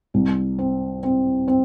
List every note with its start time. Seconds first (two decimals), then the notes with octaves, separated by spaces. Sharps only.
0.14 C2
0.59 C4
1.03 C4
1.48 C4